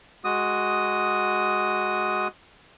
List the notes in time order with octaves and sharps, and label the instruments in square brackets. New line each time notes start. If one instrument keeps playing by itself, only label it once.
[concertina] G#3 F#4 D#6